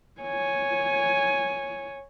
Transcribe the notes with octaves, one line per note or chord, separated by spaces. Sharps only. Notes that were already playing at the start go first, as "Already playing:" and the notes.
C#5 G#5